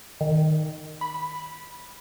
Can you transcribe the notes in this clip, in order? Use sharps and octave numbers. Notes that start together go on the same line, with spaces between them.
D#3
B5